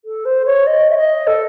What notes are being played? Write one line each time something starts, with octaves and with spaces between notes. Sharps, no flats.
A4
C5
C#5
D#5
E5
D#5
A4